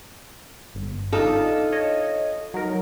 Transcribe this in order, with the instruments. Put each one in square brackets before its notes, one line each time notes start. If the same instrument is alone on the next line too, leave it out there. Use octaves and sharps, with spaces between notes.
[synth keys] G1
[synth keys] D4 D#4 D#5 [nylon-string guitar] F4 A4
[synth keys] C#5 D#5
F#3 D#4 A#4